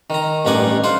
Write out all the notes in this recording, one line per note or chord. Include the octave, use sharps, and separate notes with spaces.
D#3 A#5
A1 G2 D#4 D5 F#5 G#5
F4 C5 F#5